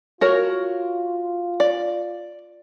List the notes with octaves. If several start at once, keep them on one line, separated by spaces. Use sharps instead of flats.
F4 F#4 A#4 C#5
D5